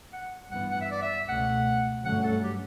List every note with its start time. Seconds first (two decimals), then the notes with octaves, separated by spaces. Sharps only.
0.13 F#5
0.51 G2 E3 B3 F#5
0.71 F#5
0.81 E5
0.91 D5
1.02 E5
1.28 C#2 B2 A3 C#4 F#5
2.05 G2 D3 F#3 A3 C#4 F#5
2.24 A4
2.44 G4